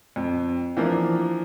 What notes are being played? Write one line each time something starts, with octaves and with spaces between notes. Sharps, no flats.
F2
E3 F3 A#3 D4